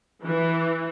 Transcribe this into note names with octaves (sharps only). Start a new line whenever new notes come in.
E3